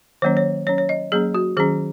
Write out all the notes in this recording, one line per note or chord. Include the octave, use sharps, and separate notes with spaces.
D#3 F#3 A#3 C#4 C#5
C#5
F#3 C#4 C#5
C#5
D#5
F#3 A#3 C#4 G#4
F#4
D#3 F#3 C#4 G#4